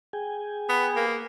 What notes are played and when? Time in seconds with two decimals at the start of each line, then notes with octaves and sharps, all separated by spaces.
0.13 G#4 G5 G#5
0.69 B3
0.96 A#3